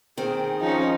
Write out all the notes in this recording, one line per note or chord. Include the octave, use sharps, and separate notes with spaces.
D#3 C4 G#4
F3 C#4 D#4